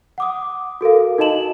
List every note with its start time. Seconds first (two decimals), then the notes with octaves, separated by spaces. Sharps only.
0.18 F#5 D6 D#6
0.81 F#4 A4 A#4 F5
1.18 D#4 F#4 D#5 A5 E7 F#7